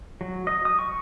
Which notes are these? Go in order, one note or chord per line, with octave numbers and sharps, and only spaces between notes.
F#3
D#5
D#6
C#6